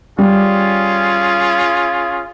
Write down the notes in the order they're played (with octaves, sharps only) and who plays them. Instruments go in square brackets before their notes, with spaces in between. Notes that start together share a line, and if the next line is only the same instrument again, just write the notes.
[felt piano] G3 [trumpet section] C#4 F4 G#4